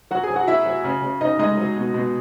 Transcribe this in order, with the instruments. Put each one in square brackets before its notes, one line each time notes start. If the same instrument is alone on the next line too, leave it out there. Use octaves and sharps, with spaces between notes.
[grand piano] F#3 F#4 F#5
G#4 G#5
F#3
F#4 F#5
F#3 E4 E5
F#3
C#3
C#3
C#3 D#4 D#5
G#3 D#4 D#5
F#3
B2
B2